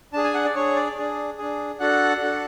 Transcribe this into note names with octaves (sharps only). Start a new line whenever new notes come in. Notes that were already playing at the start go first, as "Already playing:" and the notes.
D4 G#4 A5
G#5
F#5
D5
D4 G#4 C#5
D5
D4 G#4
D4 G#4
D4 F#4 A4 F#5
D4 F#4 A4